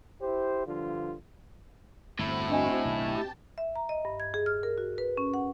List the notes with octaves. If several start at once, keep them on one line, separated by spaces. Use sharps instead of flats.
E4 G4 C5
G2 D3 F3 F4
G1 E2 A2 C4 E4 F#4
D4 D#5 G#5
B1 D#3 G4 A5
E5
A#5
D#5
G2
G#6
G#4
F6
A#4
F#4
B4
C#4
F#5